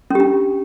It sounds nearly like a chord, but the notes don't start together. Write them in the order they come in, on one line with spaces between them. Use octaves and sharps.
C#4 G4 D4